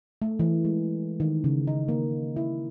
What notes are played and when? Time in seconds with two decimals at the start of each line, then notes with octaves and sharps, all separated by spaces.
0.22 A3
0.39 E3
0.65 G#3
1.20 D#3
1.44 C#3
1.67 D#4
1.88 A#3
2.36 E4